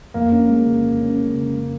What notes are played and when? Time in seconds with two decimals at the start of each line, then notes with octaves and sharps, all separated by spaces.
0.14 F2 A#3
0.32 C#4
0.49 G#3
0.66 C#3
0.84 F2
1.02 C#4
1.18 G#3
1.35 C#3
1.53 F2